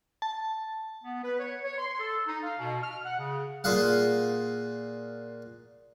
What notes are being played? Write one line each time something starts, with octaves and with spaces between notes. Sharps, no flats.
A5
B3
B4
C#5
C#5
C6
A4
D#4
F5
B2
F6
F#5
C#3
A#2 F4 G#4 F5 F#5